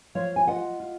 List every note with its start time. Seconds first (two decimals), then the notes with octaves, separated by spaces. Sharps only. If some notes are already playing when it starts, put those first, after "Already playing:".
0.15 F3 C#5 F5
0.36 G#5
0.47 F4 D#5 F#5
0.80 F4